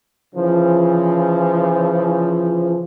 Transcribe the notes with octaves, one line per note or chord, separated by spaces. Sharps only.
C#3 E3 F3